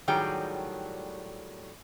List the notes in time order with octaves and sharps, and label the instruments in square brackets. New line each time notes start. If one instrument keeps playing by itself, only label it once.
[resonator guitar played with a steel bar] A2 D#3 F#3 G3 G#4 G5